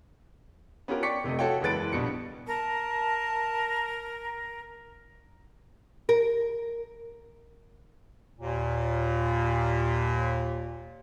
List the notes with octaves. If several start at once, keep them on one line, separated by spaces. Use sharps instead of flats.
B3 C#4 F4 G4 A#4
D5 G5 C#6 D6 B6 C#7
F1 C3 A3 D#5
F#4 A4 C#5 F5 G5
F#1 E2 G#3 B4 A6 D7
A#1 B2 G3 C#7
A#4 A5
A#4
D#2 A#2